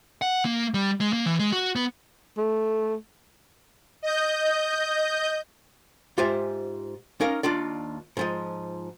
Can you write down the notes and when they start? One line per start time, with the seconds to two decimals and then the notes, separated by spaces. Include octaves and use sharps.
0.22 F#5
0.45 A#3
0.74 G3
1.01 G#3
1.13 A#3
1.26 E3
1.39 G#3
1.52 F#4
1.76 B3
2.37 A3
4.03 D#5 G6
6.18 G#2 F4 G4 C5 E5 G#5
7.21 C#4 D#4 A#4 D5 F5
7.43 D#2 D4 F4 D5
8.17 G#2 F3 D#5